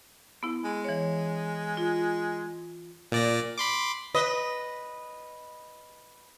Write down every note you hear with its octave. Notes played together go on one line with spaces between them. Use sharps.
B3 E4
G#3
E3 C#5
F4
A#2 D5 A#6
B5 C6 D6
B4 D#5